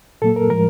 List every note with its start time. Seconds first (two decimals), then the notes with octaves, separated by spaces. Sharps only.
0.22 A#2 F#3 A#3 A4
0.36 A#4
0.50 A2 F3 G#3 A#4